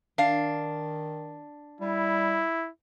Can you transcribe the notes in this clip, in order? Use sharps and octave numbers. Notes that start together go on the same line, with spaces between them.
D#3 D4 F5
G3 E4